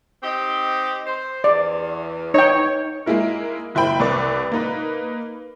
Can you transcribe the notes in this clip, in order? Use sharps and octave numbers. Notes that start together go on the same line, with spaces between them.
C4 D#4 G4
C5
E2 D5
D#4 C#5 G5
G#3 A#3 E4 A#4
F#1 E4 C5 G5 B5
C2 B4 D5 C#6
A#3 D#4 B4